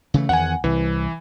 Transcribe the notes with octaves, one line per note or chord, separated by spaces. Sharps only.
C#3 E3 A3
E2 D#3 F#5 G#5
C2 E3